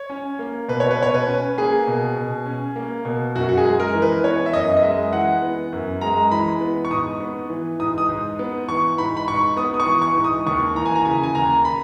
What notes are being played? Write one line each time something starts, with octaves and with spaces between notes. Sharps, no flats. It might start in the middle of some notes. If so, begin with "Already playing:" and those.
Already playing: C#5
C#4
A#3
B2 B4
C#5
B4
B2 C#5
B4
C#4
A#3 G#4
B2
B2
C#4
A#3
B2
F#2 F#4
F#4
G#4
G#3
A#4
E3
B4
B3 C#5
E5
F#2 D#5
D#5
G#3 E5
E3 F#5
B3
F#2
G#3 A#5
E3 B5
B3
C#6
G#2 D#6
B3
E3
G#2 D#6
D#6
G#2
B3
E3 C#6
G#2 B5
B5
G#2 C#6
B3 D#6
D#6
C#6
E3
C#6
G#2
D#6
D#2 C#6
E3 A#5
G#5
A#5
C#3 G#5
G#5
D#2 A#5
B5